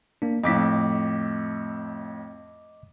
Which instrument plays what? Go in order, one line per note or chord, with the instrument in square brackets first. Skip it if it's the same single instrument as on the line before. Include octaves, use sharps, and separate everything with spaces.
[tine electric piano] A#3 D4
[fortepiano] F2 A2 [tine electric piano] D#5 D6 B6